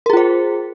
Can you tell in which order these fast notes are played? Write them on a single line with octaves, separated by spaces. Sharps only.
A#4 G#4 F4 C5